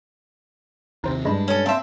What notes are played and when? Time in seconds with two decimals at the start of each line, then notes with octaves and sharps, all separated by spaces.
1.04 D#2 C3 D#4 C5
1.25 G2 G#3 D4 G#4 D#5 B5
1.48 C#4 A4
1.66 C4 E5 F5 A5 C6